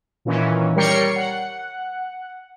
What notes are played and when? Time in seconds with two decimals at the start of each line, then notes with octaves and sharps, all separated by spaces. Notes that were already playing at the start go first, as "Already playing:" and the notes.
0.25 A#2 D#3 E3 C#4
0.76 G3 A#4 C#5 G5 C7 C#7
1.16 F#5